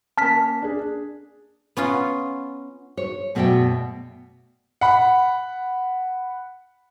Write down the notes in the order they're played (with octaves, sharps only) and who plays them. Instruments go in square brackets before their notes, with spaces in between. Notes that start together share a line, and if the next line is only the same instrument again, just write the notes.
[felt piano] A#3 C#4 [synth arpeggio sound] A5 F6 B6
[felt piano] D4 G#4
[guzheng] B3 C#4 F4
[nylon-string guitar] C#5
F#2 B2 A3 B3 D5 G5
[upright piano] F#5 B5